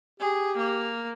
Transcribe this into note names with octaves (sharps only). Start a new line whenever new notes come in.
G4 G#4
A#3